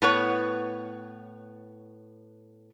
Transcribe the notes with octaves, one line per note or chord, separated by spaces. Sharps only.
A2 B3 C#5